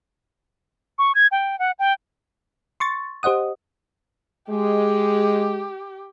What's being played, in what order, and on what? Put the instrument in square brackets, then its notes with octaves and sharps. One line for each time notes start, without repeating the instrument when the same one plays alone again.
[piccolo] C#6
G#6
G5
F#5
G5
[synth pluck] C6 C#6 A6
G4 C5 D#5 F#5 D#6
[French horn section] G#3 [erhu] G4